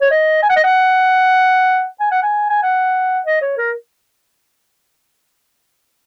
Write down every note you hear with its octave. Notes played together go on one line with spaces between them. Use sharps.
C#5
D#5
G#5
F#5
D#5
F#5
G#5
F#5
G#5
G#5
F#5
D#5
C#5
A#4